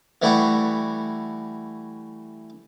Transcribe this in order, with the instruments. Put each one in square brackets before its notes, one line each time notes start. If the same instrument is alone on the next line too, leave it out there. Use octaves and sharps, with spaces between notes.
[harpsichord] E3 G3 A3 E4 F#4 G4